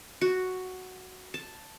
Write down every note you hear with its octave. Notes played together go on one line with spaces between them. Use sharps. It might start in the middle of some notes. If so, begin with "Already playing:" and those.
F#4
A5